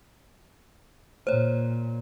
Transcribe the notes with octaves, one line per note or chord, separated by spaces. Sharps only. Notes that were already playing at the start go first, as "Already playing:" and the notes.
A#2 C5 C#5